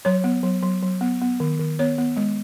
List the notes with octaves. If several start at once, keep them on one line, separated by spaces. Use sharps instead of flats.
F#3 C#5
B3
F#3
F#3
F#3
B3
B3
D#3
D#3
B3 C#5
B3
G#3